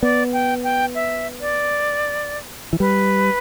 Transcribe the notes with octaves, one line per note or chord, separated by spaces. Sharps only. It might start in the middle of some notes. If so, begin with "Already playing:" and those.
B3 D5
G5
G5
E5
D5
E3
G3 B4